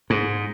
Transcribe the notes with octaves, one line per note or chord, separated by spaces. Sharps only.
G#2